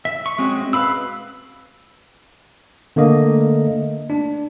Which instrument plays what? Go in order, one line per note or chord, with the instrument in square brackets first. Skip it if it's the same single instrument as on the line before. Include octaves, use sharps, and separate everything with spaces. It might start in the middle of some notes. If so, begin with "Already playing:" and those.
[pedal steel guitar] E5
C#6
G#3 C4 C#4 F#4
B4 F5 B5 E6
[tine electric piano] D3 A3 A#3 D#5
D4